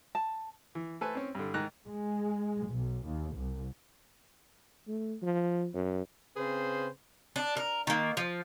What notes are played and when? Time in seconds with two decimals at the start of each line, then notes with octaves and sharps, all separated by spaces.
0.15 A5
0.75 E3
1.01 A3 A4 B4 C5 G#5
1.15 C4 C#4
1.35 G2 D3
1.54 G#2 D#3 D#4 A#5 F#6
1.86 G#3
2.67 B1
3.06 D#2
3.35 C2
4.88 A3
5.22 F3
5.74 F#2
6.36 C#3 C4 G#4 B4 C5
7.36 D4
7.57 A#4
7.87 D#3 A#3
8.17 F3